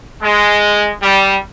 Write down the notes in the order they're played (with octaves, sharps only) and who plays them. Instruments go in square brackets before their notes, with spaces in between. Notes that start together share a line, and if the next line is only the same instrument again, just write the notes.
[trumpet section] G#3
G3